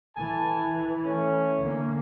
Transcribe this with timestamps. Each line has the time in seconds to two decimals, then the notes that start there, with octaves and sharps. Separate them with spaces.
0.17 E3 A4 G#5 A5
1.05 A3 C#4
1.61 D3 A#3